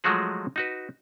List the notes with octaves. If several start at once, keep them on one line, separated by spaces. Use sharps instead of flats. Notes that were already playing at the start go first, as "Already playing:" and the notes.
F3 F#3 G#3 A3 F#4 G#4
D#4 F#4 B4